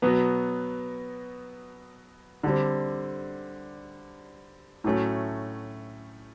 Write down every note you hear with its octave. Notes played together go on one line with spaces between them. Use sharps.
B2 F#3 B3
D3 G3 C4
A2 F#3 A3 C#4